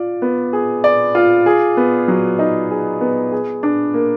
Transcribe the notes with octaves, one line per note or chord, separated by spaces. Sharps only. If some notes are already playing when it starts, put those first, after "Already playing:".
Already playing: F4 D5
B3
G#4
D5
F4
G#4
B3
F#3
D#4
G#4
B3
G#4
D4
A#3